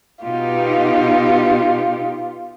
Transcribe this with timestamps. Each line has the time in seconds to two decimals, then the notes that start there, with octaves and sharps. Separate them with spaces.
0.23 B2 D#4 F4 G4